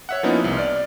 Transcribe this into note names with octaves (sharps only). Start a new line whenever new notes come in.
C#5 E5 F#5
F3 A#3 B3 C#4 D#4 E4
C2
D5 F6